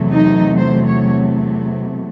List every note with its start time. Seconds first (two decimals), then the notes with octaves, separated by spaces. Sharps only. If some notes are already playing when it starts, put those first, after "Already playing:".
Already playing: E2 C3 F#3 A3
0.11 D#4
0.56 C5
0.87 C#5